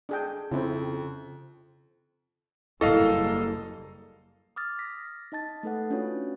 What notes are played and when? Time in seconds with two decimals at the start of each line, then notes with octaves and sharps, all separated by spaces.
0.09 D4 G#4 G5
0.52 F2 C#3 C4 E4
2.81 F#1 G3 A#3 E4 A4 D#5 F5
4.56 D6 D#6 F6 A6
4.79 A#6 B6
5.32 D#4 D#5 A5 A6
5.63 A3 D#4 A4 B4 F#5
5.90 C#4 D4 F4 F#4 B4 C#5